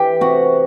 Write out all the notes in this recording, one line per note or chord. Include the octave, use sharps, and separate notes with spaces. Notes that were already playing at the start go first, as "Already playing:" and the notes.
Already playing: E3 G4 G5
C3 F#4 F#5